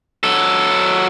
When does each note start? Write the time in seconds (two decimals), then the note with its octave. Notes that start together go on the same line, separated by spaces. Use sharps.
0.23 F#3 A4